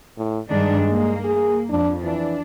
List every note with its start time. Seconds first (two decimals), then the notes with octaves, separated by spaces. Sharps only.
0.18 A2
0.50 G2 D#3 G#3 D4
0.88 A#3
1.25 G#4
1.70 F2 D4
2.03 E3 D4